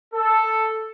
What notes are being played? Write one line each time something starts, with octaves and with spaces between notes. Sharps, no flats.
A4